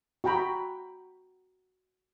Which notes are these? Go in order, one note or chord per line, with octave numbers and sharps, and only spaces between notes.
F#4 G5 A#5 B5